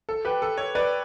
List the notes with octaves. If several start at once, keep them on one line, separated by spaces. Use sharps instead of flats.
A4
G4 B4
A4
A4 C#5
B4 D5